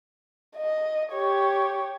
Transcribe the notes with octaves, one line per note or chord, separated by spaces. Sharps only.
D#5
G4 C#5